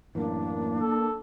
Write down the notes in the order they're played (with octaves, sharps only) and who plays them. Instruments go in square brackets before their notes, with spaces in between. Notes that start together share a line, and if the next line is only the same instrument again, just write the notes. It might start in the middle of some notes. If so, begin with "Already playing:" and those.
[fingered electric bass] F#2 A2 E3 [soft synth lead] A#3 [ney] D4
[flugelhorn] A4